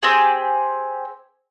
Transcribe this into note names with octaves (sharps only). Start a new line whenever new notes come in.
C4 G4 G#4